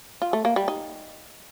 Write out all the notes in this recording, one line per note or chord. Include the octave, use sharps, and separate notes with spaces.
F4
A3
A#3
G3
D#4